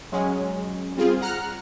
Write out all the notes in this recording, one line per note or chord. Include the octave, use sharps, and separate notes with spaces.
F#3 G#3 C#4
G3 C4 F4 G#4
F#5 A#5 F6 F#6